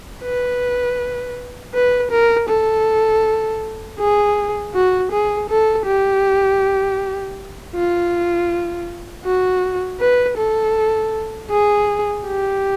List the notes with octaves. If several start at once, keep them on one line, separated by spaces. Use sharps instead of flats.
B4
B4
A#4
A4
G#4
F#4
G#4
A4
G4
F4
F#4
B4
A4
G#4
G4